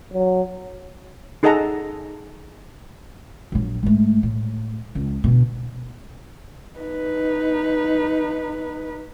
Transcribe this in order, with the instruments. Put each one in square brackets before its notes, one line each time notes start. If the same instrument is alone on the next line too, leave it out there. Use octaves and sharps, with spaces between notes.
[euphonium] F#3
[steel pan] D#4 G#4 A4 D#5 F#5 A#5
[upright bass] A#1 F#3
G#2 A3
A2
C#2
B2 D3
[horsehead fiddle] D#4 B4